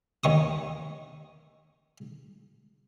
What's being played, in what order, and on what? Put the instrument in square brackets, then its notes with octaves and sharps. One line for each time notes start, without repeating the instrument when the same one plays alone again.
[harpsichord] D#2 D#3 C#6 D#6